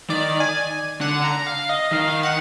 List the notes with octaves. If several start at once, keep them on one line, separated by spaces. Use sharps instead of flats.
D#3 D5
G#5
D3 F#5
A#5
F5
D#5
D#3 F5
F#5